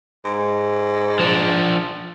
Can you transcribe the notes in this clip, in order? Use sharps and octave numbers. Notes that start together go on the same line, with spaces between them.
G#2
F3 D4